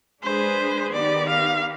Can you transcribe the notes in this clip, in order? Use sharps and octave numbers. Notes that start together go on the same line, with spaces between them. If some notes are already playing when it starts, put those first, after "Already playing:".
G#3 D4 G#4 B4 C5
D#3 B3 D#4 G4 D5
F5